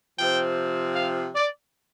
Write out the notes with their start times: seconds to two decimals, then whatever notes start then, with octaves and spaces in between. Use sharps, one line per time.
0.18 C3 F3 C4 G5
0.96 F5
1.35 D5